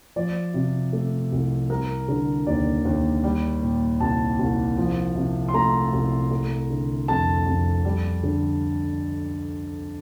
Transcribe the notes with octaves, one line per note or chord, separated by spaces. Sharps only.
F3 D5
C3
A3
C2
G3 A#4
D3
D#2 D5
D#2
G3
A#2
C2 A5
C2
F3
C3
C6
A3 A#5
C2
A3
D3
F2 A5
F2
G3
D3